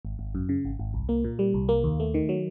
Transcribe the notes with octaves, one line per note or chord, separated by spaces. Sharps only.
G#1
G#1
F#2
C#3
G#1
G#1
C2
A#3
A#2
G3
C2
A#3
D#2
A3
D#3
F#3